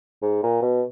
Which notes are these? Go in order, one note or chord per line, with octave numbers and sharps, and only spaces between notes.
G#2
A#2
B2